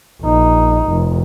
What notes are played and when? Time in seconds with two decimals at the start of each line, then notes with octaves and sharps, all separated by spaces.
0.21 A#1 D#4
0.89 F1